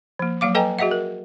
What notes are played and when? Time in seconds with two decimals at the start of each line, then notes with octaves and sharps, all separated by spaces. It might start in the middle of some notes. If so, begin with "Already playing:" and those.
0.19 F3 A#3
0.41 F#3 A#3 F5 D6
0.55 A4 B4 D#5 G5 G#5 A#5
0.79 F#4 G#4 D#5 E5 F#5
0.91 A#4